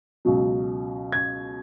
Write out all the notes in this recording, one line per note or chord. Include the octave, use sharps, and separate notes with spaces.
C#2 B2 F#3
G#6